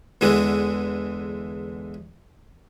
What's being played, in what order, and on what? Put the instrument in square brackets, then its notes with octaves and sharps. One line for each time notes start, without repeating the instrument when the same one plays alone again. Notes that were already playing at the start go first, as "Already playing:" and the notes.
[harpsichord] E2 D3 E3 G#3